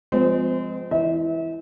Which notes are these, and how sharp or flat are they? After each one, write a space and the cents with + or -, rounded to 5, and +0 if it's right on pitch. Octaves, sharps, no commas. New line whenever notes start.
F3 +20 G#3 +0 C4 -35
E3 +0 E5 -35